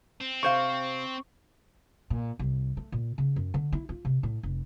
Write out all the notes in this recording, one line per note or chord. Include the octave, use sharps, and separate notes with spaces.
C4
C3 C5 F5 C#6
A#2
C2
A3
A#2
C#3
F#2
D3
E4
F4
C3
A2
F1